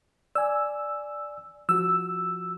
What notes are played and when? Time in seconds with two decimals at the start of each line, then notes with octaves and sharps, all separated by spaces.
0.35 D5 G#5 E6
1.69 F3 F#4 E6